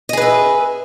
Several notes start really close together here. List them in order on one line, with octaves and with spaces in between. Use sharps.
D#5 G#4 B4 E5